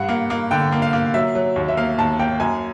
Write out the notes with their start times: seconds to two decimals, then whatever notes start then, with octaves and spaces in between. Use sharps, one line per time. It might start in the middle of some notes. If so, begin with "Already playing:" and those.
Already playing: G2 F#5
0.09 A#3
0.30 A#3
0.51 D3 G5
0.72 A#3
0.82 F5
0.93 A#3
1.14 F#3 E5
1.35 F#3
1.56 D#2
1.68 E5
1.77 A#3 F5
1.98 D#2 A5
2.19 A#3 G5
2.40 F#2 G#5